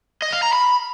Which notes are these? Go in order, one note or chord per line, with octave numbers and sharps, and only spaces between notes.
D#5
F5
A#5
B5